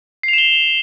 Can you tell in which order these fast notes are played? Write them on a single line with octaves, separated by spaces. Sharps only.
C7 F7 E7 G7